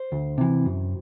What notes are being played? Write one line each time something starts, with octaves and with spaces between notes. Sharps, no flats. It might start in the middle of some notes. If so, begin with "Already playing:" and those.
Already playing: C5
D2
C3 E3
F#2